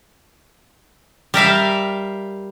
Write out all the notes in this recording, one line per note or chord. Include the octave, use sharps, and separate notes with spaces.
G3 A#4 E5 F5